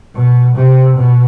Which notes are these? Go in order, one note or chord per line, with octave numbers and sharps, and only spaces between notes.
B2
C3
B2